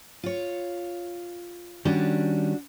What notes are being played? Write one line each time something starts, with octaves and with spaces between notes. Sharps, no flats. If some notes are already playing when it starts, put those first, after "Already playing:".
F4 C#5
D#3 G3 C#4 D4 F#4